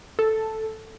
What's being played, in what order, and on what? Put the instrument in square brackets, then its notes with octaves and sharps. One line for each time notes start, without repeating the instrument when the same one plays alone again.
[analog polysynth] A4